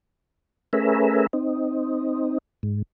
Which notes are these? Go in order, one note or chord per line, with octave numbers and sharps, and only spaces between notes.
A3 C#4 G#4 A#4 B4 E5
C4 D#4
G#2